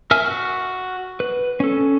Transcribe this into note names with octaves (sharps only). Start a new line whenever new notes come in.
A#4 E5 G#5 E6 F6
F#4
B4
C#4 A4